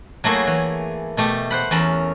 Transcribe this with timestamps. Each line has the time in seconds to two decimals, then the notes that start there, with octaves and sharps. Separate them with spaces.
0.24 F#3 A3 A#3 E4 G#4
0.47 E3
1.17 B2 A3 G4
1.51 C5 F#5 B5
1.71 E2 C#4 A#4 A5 B5